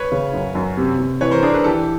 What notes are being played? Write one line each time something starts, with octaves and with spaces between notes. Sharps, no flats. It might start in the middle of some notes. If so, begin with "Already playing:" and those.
Already playing: B4 C#5
C#3
F#2
F#2
C3
C3
E3 B4 C#5
A#4 C5
D4 G#4 A#4
A4 B4
E3 G4 A4